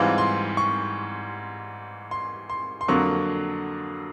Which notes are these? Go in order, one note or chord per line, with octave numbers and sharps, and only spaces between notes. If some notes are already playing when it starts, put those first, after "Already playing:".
Already playing: G#2 E3 G3 C4 F4 B5
C6
C#6
C6
C6
C6
F2 D3 F#3 A#3 C#6